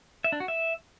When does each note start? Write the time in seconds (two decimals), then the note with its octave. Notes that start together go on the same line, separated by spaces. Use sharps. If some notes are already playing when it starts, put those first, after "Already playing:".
0.24 E5
0.32 D4
0.40 F#4
0.48 E5